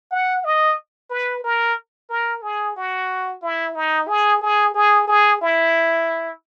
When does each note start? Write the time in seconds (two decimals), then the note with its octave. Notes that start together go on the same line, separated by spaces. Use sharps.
0.11 F#5
0.44 D#5
1.10 B4
1.44 A#4
2.09 A#4
2.42 G#4
2.76 F#4
3.42 E4
3.75 D#4
4.08 G#4
4.41 G#4
4.74 G#4
5.07 G#4
5.41 E4